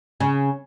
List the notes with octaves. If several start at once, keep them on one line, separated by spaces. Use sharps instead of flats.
C#3